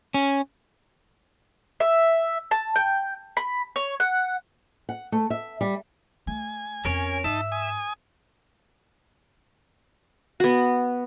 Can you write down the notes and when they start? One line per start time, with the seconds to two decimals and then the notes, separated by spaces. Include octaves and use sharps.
0.14 C#4
1.80 E5
2.51 A5
2.76 G5
3.37 B5
3.76 C#5
4.00 F#5
4.89 F#5
5.12 A3
5.30 E5
5.61 G3
6.27 A3 G#5
6.85 F2 C#4 A#4 C#5
7.24 G#2 D#4 E5 A5
7.52 G#5 D#6
10.40 B3 F#4